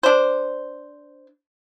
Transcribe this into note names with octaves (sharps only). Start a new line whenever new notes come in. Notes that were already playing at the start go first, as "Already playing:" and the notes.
D4 C5